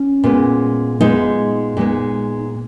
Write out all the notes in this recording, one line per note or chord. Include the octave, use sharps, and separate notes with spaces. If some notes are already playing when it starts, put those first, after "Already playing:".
Already playing: C#4
A#2 G#3 B3
A#2 G#3 B3 D#4
A#2 G#3 B3